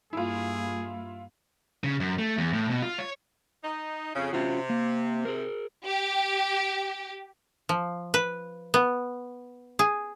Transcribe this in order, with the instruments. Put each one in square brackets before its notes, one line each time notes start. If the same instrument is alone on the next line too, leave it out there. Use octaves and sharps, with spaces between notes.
[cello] G2 A#3 [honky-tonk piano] E4 F4 [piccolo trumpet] G#4
[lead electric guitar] C#3
F#2
A3
E2
A2
B2
F4
C#5
[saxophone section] D#4
F2 C#3
[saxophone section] C3 [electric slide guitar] C#4 F4 F#4
[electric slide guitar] A#3
G#4 A#4
[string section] G4
[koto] F3
B4
B3
G#4